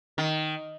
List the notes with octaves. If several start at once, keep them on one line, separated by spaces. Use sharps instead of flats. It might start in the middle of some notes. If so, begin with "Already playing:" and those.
D#3